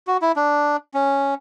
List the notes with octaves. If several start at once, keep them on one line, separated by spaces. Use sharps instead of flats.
F#4
E4
D4
C#4